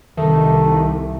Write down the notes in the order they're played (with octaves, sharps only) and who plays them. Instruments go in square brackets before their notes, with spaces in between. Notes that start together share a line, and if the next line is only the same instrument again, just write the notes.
[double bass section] C2 [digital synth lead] D#3 [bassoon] A3